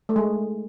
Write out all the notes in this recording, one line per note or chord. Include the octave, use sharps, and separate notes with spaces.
A3
G#3